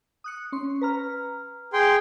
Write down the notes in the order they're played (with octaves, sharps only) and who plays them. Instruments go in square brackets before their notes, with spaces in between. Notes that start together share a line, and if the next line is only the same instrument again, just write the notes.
[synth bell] D#6 F#6 C#7
C#4 C6 C#7
B4 A#5 F6
[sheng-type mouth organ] G#4 G5 C6